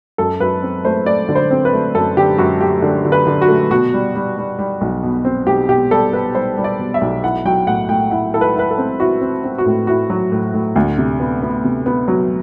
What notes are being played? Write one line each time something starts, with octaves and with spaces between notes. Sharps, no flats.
F#2 A4
F#2 B4
C4
A3 C5
A3 D5
D3
C5
C4
B4
A3
F#2 A4
D3 G4
F#2 F#4
A3 G4
D3
D3
B4
D3
F#4
A3
B2 F#4
G3
G3
G3
G3
B1
B2
C4
B1 G4
B2 G4
G3 A4
B2 B4
G3 C5
G3
D5
B2
E5
B1
E4 F#5
F#3 G5
A2 F#5
A2 G5
E4 F#5
E4 A4
B4
E4 B4
A4
C4
E4 F#4
C4
C4
F#4
A2
E4 F#4
F#3
A2
A2
D2
C3
B3
B3
C3
B3
F#3